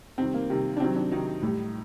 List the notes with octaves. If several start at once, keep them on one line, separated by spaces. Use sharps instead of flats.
C3 D#3 G3 C4
A#3
C3 D#3 G3
D4
C3 D#3 F#3 C4
D4
C3 D#3 F#3 D#4
A2 G3